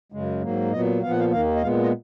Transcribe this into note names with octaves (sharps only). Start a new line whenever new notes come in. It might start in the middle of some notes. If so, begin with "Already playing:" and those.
F#2 C#3 G#3
G#2 F#3 A#3
A#2 F#3 B3 D#5
A#2 F3 B3 F5
F#5
F5
D#2 D#3 A#3 F5
D#5
A#2 G#3 B3 F5
D#5